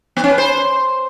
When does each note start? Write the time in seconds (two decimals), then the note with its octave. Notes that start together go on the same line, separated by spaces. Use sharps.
0.17 B3
0.24 C#4
0.31 B4
0.38 C5